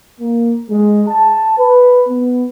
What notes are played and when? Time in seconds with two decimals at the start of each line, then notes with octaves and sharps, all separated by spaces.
0.20 A#3
0.69 G#3
1.07 A5
1.57 B4
2.07 B3